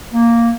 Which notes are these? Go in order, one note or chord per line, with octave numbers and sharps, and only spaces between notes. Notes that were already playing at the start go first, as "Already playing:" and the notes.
A#3